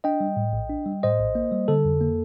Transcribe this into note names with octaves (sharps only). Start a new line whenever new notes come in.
D4 D#5 G5
G3
A2
A#1
D4
G3
A2 C5 D#5
A#1
A#3
G3
D3 A4
F2
A#3